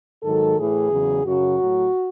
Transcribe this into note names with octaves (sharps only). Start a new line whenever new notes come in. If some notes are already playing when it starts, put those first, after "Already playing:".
G#2 D#3 F#3 A4
A2 E3 G#4
E2 C#3 F#3
F#2 C#3 F#3 F#4
A2 F#3